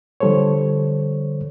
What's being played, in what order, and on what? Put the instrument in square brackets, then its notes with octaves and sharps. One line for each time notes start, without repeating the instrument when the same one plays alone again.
[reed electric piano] D3 F3 G3 A4 C5 C#5